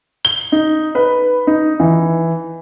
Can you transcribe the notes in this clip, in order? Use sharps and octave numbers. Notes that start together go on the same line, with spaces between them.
G7
D#4
B4
D#4
E3